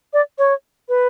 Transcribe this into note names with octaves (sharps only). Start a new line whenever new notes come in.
D5
C#5
B4